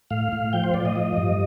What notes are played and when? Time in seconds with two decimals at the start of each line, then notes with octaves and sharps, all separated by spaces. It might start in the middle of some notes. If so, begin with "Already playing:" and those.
0.11 A2 F5
0.32 A2
0.53 F3 G5
0.64 C5
0.74 A2 D5
0.85 D#5
0.96 F3
1.17 G2